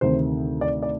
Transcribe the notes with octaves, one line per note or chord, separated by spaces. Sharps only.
D2 C3 D#3 C5
D5
D5